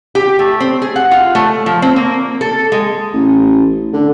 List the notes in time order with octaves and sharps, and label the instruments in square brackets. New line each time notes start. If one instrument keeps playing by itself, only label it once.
[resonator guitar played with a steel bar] G4
A3
C4
G#4
F#5
F4
A3
F3
C4
A#3
A4
G#3
[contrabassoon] A1
D3